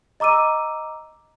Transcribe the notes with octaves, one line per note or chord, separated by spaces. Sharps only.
D#5 A#5 D6 E6 D#7